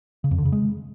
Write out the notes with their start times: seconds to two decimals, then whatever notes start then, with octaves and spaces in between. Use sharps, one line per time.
0.24 C#3
0.31 F2
0.38 D3
0.45 C#3
0.52 G#3